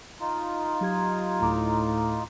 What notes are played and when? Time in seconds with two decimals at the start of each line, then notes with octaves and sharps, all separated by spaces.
0.20 D#4 F4
0.81 F#3 G4 G#6
1.41 D2 A2 A#5 D6